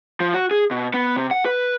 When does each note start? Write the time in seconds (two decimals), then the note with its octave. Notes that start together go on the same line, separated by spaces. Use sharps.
0.20 F3
0.34 F#4
0.51 G#4
0.71 B2
0.94 B3
1.16 C3
1.31 F#5
1.45 B4